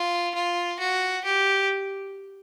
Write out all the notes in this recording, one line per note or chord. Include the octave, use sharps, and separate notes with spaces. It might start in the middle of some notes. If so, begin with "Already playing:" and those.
Already playing: F4
F4
F#4
G4